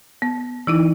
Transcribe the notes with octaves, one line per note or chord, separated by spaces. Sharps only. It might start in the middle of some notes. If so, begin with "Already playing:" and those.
B3
E3 D#4 E4